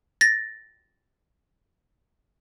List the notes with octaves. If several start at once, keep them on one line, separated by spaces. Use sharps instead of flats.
A6 A#6